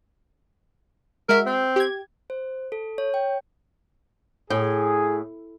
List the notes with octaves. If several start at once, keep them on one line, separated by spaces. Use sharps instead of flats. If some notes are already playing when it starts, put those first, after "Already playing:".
G#3 F#4 A#4 E5
C4
G4 G#6
C5
A4
C#5
G5
A2 G#4